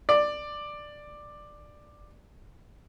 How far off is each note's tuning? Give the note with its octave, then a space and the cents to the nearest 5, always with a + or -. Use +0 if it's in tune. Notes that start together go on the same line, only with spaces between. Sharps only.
D5 +10